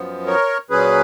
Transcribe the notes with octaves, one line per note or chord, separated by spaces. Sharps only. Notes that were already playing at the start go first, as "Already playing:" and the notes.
Already playing: F#2 F3 B3
A#4 C#5
A#2 F#3 C#4 G#4 B4